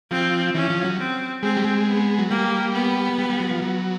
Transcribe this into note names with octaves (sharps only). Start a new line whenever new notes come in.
F3 C4
E3 C#4
F3
F#3
C4
G#3 C4
G3
G#3
B3
F#3
G3 A#3
B3
G3
G3
F#3
F3
F#3